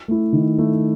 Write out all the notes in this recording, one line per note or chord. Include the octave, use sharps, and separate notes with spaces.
A3 E4
D#3
A3 E4